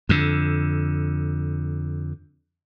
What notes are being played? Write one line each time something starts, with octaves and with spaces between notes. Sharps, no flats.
F2 D3